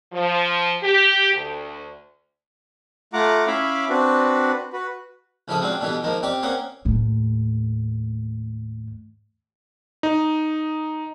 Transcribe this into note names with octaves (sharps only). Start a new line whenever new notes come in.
F3
G4
D2
A3 F4 F#5 A#5 D6
C#4 E4 E5 F5 B5 D6
C4 D4 F#4 B4
F#4 B4
C#2 F3 E4 F4 A4 D#6
F#3 G#3 C4 D4 F4
B2 D3 E3 G3 F4
D#3 F3 G#3 A#3
C4 F4 G4 D5
A#3 C4 C#4 G#4 F#5
D#2 A2
D#4